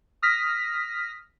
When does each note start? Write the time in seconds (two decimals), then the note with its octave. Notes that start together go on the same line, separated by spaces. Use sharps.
0.22 D#6 F6 A#6 B6